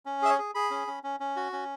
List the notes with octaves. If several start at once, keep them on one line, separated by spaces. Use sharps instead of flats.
C#4
G#4 E5
C#5
G#4
G#4 B5
C#4
C#4
C#4
C#4
F#4
C#4